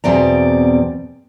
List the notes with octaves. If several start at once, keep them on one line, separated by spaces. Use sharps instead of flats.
E2 B2 C4 D5 A#5